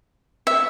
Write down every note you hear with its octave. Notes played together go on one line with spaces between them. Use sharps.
E5